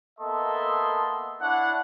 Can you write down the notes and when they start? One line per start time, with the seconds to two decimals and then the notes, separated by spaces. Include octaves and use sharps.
0.19 A#3 B3 A4 D#5 E5 C6
1.41 D4 E4 C#5 F#5